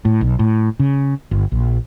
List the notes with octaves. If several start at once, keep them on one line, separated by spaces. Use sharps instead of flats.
A2
B1
A2
C#3
G1
A#1